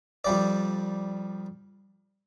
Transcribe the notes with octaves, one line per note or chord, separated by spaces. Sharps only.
F2 G3 D5